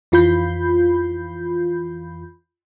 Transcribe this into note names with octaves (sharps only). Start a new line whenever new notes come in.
F2 E3 F4 B5 G6